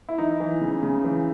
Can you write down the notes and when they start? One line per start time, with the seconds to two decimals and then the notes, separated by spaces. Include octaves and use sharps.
0.09 E4
0.18 E3 D#4
0.40 E3
0.61 C#3
0.83 C#3
1.04 E3